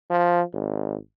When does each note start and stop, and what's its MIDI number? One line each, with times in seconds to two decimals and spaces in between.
0.10 0.41 53
0.53 0.96 32